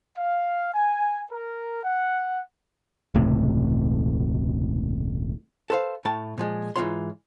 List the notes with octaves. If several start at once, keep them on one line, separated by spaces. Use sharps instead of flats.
F5
G#5
A#4
F#5
E1 C#2 A2 C3
A4 B4 C5 E5 F5
A2 A3 G5 A5
A#2 F3 G#3
G#2 E3 A#3 F4 C#5 C6